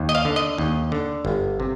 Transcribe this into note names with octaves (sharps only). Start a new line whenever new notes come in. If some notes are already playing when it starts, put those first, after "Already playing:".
Already playing: D#2
D#5
F5
D3
D#5
D#2
D3
G1
C3